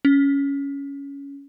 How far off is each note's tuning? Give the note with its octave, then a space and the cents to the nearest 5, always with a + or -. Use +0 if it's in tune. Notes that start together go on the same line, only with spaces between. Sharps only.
C#4 +10